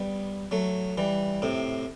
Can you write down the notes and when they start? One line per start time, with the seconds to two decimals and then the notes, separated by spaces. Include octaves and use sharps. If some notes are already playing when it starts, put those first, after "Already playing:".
Already playing: G3 B3
0.51 F#3 A3
0.97 E3 G3
1.42 A2 C3